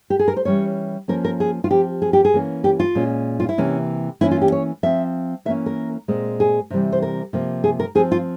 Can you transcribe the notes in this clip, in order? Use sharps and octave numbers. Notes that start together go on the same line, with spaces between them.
G4
G#4
A#4
C5
E3 G3 C#4 C#5
F3 A#3 C#4 A#4
A#4
G#4
F4
F3 C4 G4
G#4
G4
G#4
E3 A#3 C#4
G4
F4
A#2 G#3 C#4
F4
E4
C3 E3 A#3 C#4
E3 A#3 C#4 E4
F4
G4
C#5
F3 C4 E5
E3 A#3 C#4 E5
A#4
A#2 G#3 C4
G#4
C3 E3 G3 C4
C5
A#4
C3 F3 A#3
G#4
A#4
F3 C4 G#4
F4